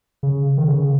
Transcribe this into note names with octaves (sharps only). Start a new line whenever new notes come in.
C#3
D#3
C#3